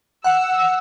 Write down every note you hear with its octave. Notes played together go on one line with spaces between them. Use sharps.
F#5 E6